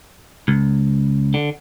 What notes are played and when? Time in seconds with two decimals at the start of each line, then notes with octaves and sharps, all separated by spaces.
0.48 C#2
1.34 D3